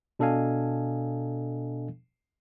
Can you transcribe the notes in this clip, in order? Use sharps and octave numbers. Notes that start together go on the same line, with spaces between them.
B2 D4 A4 D#5 F5 G#5